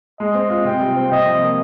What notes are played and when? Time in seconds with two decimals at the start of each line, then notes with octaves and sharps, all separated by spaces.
0.20 G#3 D#5
0.35 C4
0.50 F4
0.65 C3 G5
0.80 G3
0.96 C4
1.11 C3 D#5
1.26 F3
1.42 A#3